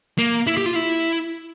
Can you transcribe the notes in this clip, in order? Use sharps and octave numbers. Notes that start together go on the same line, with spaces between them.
A#3
E4
G4
F4
E4